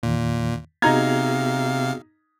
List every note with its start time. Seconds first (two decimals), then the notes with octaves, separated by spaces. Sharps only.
0.03 E2 A#2 D#3
0.82 C3 B3 D#4 F#4 G#4 F5 A#5 G#6